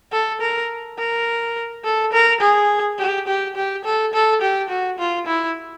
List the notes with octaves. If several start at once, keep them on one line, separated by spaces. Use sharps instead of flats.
A4
A#4
A#4
A4
A#4
G#4
G4
G4
G4
A4
A4
G4
F#4
F4
E4